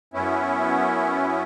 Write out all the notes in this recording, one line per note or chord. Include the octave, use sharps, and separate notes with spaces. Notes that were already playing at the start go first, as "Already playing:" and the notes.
F#2 B3 C#4 E4